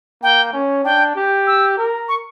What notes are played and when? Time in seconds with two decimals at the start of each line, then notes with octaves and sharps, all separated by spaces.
0.23 A#3 G5
0.53 C#4
0.84 D4 G5
1.16 G4
1.47 E6
1.77 A#4
2.08 C#6